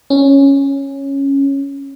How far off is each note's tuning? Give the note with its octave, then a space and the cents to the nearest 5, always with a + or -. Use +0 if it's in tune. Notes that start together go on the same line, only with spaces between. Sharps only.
C#4 -5